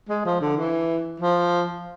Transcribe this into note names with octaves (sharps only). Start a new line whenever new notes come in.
G#3
F3
D3
E3
F3